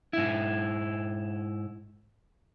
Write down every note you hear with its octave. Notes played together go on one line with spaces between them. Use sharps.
G#2 E4